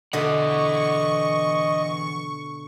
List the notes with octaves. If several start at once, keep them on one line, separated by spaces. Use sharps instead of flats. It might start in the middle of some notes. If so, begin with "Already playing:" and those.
B2 D3 E3 D#5 E5 F#5 C#6